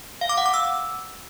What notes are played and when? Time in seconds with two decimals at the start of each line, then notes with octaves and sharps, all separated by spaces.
0.21 F5
0.29 D6
0.38 F#5
0.46 D6
0.54 E6